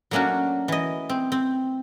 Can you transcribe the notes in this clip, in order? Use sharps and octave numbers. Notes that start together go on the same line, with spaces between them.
F#3 A3 A#3 C#4 D4 F#4
E3 D#5
C4
C4